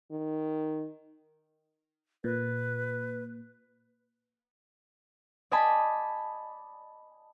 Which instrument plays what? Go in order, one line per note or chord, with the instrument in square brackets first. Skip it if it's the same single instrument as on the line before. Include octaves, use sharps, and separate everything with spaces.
[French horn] D#3
[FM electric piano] A#2 [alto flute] B4
[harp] D5 D#5 G#5 A5 B5